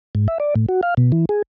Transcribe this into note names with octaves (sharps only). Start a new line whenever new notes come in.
G#2
E5
D5
A2
F#4
F5
B2
E3
G#4